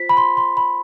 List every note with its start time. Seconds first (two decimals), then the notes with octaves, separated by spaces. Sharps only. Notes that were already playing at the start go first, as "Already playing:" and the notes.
Already playing: F4 C5 B6
0.09 B5
0.17 C6
0.37 C6
0.57 B5